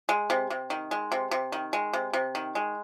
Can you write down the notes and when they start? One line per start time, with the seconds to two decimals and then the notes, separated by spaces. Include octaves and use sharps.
0.09 G#3
0.30 C3
0.50 C3
0.70 D#3
0.91 G#3
1.12 C3
1.31 C3
1.52 D#3
1.73 G#3
1.93 C3
2.13 C3
2.35 D#3
2.55 G#3